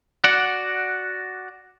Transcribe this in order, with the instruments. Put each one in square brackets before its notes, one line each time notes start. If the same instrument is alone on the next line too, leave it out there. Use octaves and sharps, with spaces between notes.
[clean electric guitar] F#4 D5 F#5